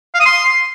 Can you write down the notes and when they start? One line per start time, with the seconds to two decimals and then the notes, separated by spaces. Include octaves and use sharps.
0.14 F5
0.20 D#6
0.26 C6